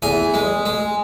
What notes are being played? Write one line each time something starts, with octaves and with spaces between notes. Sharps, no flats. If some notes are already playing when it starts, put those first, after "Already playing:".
E2 G#5
G#3
G#3